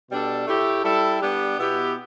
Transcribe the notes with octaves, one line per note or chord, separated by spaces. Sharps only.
B2 G3 D4 A4
A2 A3 E4 G4
G3 E4 A4
G3 B3 D4 G4
B2 B3 E4 G4